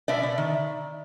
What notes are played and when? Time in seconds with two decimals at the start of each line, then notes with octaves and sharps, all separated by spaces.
0.08 B2 D5 E5
0.23 B2
0.38 D#3